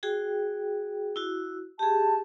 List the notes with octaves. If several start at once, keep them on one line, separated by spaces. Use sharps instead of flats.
F#4 G#4 G5
E4 F#4
G4 G#4 A5